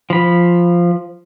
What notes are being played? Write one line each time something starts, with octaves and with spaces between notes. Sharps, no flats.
F3 B5